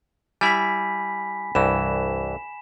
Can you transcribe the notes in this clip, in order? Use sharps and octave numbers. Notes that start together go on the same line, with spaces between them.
G3 E4 G#5 B5 B6
C2 G2 E3 E7